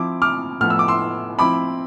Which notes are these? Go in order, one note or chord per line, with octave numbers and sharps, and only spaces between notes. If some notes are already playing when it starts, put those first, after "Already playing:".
Already playing: F3 C4 E4 D6
D6 F6
A2 F3 B3 F6
E6
D6
C6 E6
F3 C4 E4 B5 D6